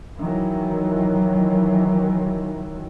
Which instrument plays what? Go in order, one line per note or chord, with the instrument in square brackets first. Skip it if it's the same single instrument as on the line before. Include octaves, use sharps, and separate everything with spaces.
[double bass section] D#3 E3 F#3